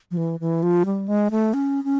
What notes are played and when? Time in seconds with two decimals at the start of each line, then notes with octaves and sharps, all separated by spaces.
0.11 F3
0.17 E3
0.40 E3
0.63 F3
0.85 G3
1.08 G#3
1.31 A3
1.54 C#4
1.84 C#4